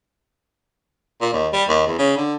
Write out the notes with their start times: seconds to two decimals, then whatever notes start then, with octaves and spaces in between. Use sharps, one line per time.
1.21 A#2
1.33 D#2
1.53 G3
1.69 D#2
1.87 E2
1.98 C#3
2.16 D3